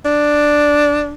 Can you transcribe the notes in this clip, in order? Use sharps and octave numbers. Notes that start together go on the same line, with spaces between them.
D4